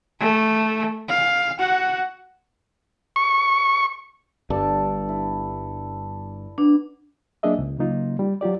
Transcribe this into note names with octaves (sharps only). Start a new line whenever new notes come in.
A3
F5
F#4 F#5
C#6
G1 G2 A4 D5 A5
E4
B3 D4
F#3 A#3 D4 G#4 D#5 E5
C#2
C#3 F#3 A#3 D#4 F4
G3
F#3 F4 G4 D5